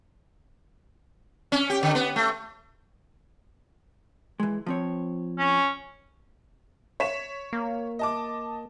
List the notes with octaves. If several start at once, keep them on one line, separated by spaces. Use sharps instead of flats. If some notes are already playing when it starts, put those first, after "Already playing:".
C#4
G4
D3
B3
A3
E3 G#3
F3 C4 C#5
C#4
C#5 B6 E7
A#3
D#5 A5 D6